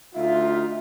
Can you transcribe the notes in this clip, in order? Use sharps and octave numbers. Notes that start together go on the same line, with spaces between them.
D2 D#4 F4 E5